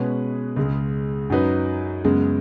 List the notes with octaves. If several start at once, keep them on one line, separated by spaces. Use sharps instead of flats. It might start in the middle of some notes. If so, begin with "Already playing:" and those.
Already playing: B2 G#3 C#4 G#4 B4
C#2 C#3 G#3
F#2 F#3 D#4 B4
F#2 C#3 G#3 B3